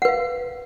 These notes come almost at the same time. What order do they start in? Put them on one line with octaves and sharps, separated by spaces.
F#5 B4 F5